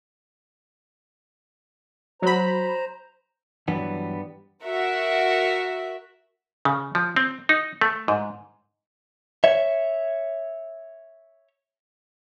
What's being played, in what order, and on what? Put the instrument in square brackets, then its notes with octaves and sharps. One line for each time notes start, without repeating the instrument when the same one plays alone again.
[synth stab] F#3 B5 [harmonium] C5 A#5
[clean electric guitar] G2 G3 B3 [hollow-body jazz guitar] E3 F#3
[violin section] F#4 A#4 E5
[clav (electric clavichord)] C#3
F3
C4
D#4
A3
G#2
[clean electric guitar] C#5 E5